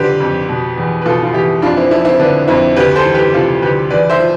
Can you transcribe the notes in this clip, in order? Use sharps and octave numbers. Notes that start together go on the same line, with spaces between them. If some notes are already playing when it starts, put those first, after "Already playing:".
Already playing: F2 D3 F3 G4 B4 C5 D5
F2
B2
E2
B4
B2 F4 A4
F4
E2 E4 G4
F2 D4 F4
C4 E4
F3 C4 E4
C4 E4
D3 B3 D4
F2 C4 E4
D2 G4 B4
A4 C5
E3
G4 B4
C3 F4 A4
D2 G4 B4
E2 B4 D5
C5 E5
F3